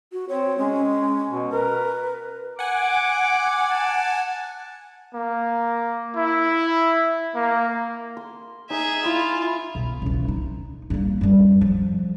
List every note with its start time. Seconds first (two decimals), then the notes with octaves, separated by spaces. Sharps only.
0.12 F#4
0.29 C4 C#5
0.58 G#3 C#4
1.29 B2
1.52 A#4 B4
2.59 F#5 G#5 D6
3.71 A5
5.14 A#3
6.16 E4
7.35 A#3
8.17 C6
8.70 D#4 G#4 E5
9.05 E4 F4
9.75 B1
10.02 C#2 E3
10.28 D#4
10.90 G2 A#3
11.21 F#2 G3
11.61 F3